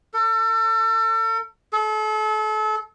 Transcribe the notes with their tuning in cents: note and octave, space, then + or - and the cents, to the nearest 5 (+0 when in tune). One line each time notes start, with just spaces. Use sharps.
A4 +35
A4 -35